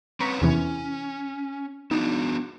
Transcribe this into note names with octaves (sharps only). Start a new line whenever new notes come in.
C4 C#4 B4 A#5 C#6 B6
E2 C3 E3 C#4
B3 D4 D#4 F#4